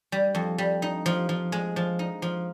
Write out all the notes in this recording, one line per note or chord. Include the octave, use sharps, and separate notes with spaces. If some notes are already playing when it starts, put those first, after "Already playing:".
G3
F2
G3
D#4
F3
F3
G#3
F3
D#4
F3